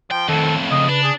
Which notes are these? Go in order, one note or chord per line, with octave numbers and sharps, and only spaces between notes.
F3 G5
F2 A2 D#3 A4
C#3 D#5
D4 B4
G#4